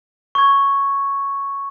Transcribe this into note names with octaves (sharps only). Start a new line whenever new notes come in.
C#6 G#6